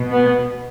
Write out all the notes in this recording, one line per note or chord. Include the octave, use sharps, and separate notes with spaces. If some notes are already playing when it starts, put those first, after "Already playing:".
Already playing: B2
B3